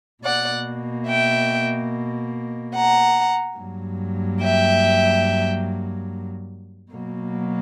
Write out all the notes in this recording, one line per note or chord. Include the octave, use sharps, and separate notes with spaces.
B2 A#3 D5 F#5
E5 G5
F#5 A#5
G2 F#3 A#3
E5 G5
B2 F#3 A#3